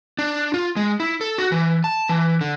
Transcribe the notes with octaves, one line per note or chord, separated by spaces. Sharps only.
D4
F4
G#3
E4
A4
F#4
E3
A5
E3
D3